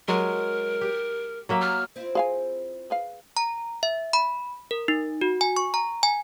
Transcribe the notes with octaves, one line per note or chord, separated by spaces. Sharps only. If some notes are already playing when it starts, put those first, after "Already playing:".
F#3 G#3 A#4
G4
F#3 A#3 E5
F6
C4 E4 F4
G#4 F5 G#5
G#4 B4 F5
A#5
E5
B5
A#4
D#4
F#4
G#5
C#6
A#5
G#5